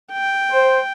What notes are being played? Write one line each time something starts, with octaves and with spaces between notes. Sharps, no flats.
G5
C5